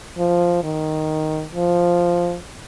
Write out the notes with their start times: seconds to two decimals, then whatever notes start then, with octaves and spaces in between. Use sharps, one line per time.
0.18 F3
0.64 D#3
1.55 F3